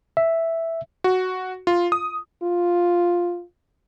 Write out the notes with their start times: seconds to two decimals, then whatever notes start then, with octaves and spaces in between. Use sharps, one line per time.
0.17 E5
1.04 F#4
1.67 F4
1.92 D#6
2.43 F4